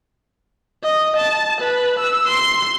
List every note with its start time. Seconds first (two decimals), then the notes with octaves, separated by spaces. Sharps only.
0.84 D#5
1.17 A5
1.61 B4
1.99 E6
2.27 C6